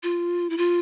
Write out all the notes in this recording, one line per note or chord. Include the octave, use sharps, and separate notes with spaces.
F4
E4
F4